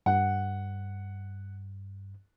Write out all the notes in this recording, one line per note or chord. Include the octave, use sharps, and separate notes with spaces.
G2 F#5